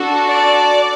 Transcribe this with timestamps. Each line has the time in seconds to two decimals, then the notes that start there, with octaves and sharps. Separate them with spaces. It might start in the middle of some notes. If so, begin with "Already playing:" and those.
Already playing: D4 F#4 A4
0.26 D5